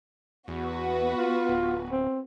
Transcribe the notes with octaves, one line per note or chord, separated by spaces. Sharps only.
E2 B3 F#4 B4
F4
D1
C4